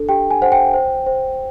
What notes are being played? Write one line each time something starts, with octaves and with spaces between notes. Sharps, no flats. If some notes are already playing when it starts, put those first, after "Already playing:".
Already playing: D4 A4
G4 G5
G#5
C5 F#5
G5
C5
C5